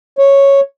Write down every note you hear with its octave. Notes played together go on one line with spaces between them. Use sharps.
C#5